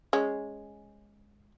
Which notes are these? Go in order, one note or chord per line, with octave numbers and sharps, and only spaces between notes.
G#3 C#4